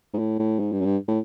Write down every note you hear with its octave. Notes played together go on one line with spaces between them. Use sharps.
G#2
A2
A2
G#2
G2
F#2
G2
A2